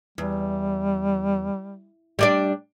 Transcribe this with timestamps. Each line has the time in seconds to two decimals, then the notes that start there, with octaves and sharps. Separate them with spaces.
0.18 E2 G3
2.19 G3 D4 D5